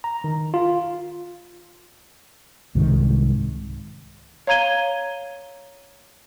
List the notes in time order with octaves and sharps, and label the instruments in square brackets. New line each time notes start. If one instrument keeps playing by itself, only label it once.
[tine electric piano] A#5
D#3
F4
[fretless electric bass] C2 G#2 D#3
[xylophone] C#5 F5 A#5 G#6 D#7 G7